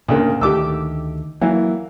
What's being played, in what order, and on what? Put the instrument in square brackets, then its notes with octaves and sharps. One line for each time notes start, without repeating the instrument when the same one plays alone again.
[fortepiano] D2 A#3 [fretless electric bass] A#2 C#3
[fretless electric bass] D2 D#3 A3 [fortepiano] G4 D6 E6
[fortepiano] E3 [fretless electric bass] F#3 A#3